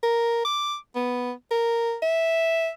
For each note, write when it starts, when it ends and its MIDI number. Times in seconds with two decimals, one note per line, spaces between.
0.03 0.45 70
0.45 0.76 86
0.95 1.32 59
1.51 1.96 70
2.02 2.70 76